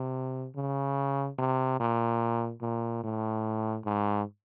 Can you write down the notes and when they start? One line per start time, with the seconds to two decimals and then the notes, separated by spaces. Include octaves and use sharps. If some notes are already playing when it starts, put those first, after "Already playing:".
Already playing: C3
0.55 C#3
1.38 C3
1.80 A#2
2.62 A#2
3.04 A2
3.85 G#2